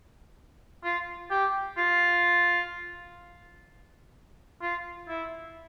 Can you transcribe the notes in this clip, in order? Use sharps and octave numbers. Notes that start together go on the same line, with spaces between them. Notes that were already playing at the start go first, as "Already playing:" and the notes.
F4
G4
F4
F4
E4